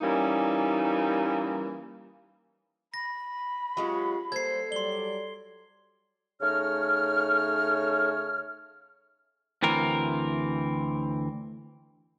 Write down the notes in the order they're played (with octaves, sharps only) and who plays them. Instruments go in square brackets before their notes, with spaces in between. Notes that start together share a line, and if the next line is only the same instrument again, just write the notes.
[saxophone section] E3 G3 A#3 C#4 D#4
[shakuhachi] B5 [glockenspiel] A#6
[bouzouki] F#3 G#3 C#4 [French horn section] F4 G4
[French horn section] G3 A#3 C5 [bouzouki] A4 [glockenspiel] G#6 C7
[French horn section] F#3 G3 D5 [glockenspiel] C6 G7
[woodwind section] C#3 A3 D#4 C#5 F6
[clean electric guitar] D2 E3 C4 A#4